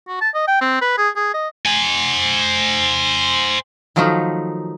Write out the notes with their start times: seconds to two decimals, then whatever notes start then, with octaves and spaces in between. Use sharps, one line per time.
0.08 F#4
0.21 A5
0.34 D#5
0.48 G5
0.61 C4
0.81 B4
0.97 G#4
1.16 G#4
1.34 D#5
1.66 C5 G#5
3.96 D#3 F3 F#3 A3 D#4